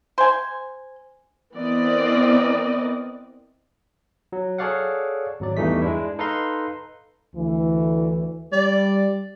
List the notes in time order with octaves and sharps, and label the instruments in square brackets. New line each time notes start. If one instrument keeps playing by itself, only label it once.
[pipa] C5 G#5
[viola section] E3 B3 C4 A#4 D5 D#5
[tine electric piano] F#3
G#4 A4 C#5 D5 F5 F#5
G#1 F#3 D5
E2 G2 E3 A3 D#4 B6
G#3 D4 E4
D#4 A4 B4 F5 A#5 C6
[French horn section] D2 E3
[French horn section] G3 [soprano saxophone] D5